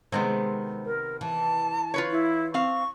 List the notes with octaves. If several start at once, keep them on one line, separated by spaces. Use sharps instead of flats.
C3 D#3 G#3 B3 C4
A#4
E3 A5
F4 B4 C#5
E4
C4 F5 C#6